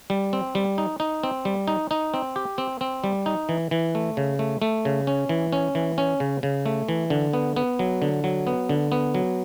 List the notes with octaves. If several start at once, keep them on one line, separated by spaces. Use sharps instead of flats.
G3
C4
G3
D#4
D#4
C4
G3
D#4
D#4
C4
G4
C4
C4
G3
D#4
E3
E3
A3
C#3
A3
A3
C#3
C#4
E3
C#4
E3
C#4
C#3
C#3
A3
E3
D3
B3
B3
F#3
D3
F#3
B3
D3
B3
F#3